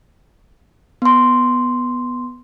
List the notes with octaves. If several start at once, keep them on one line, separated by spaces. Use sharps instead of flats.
B3 C6